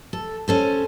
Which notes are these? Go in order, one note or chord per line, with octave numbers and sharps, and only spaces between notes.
A4
C#4 A4 C5